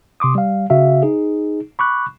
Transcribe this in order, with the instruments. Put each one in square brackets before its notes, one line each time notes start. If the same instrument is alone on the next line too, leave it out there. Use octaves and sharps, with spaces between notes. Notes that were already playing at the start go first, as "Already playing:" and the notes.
[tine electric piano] C3 C6 D6 D#6
G3 F5
C#3 F#4 E5 F5
D#4 G#4
B5 C#6 D6 F#6